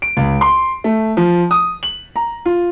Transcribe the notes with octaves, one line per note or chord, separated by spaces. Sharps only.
D7
C#2
C6
A3
F3
D#6
F#7
A#5
F4